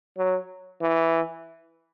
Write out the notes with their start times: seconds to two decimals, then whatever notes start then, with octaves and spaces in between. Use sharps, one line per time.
0.18 F#3
0.82 E3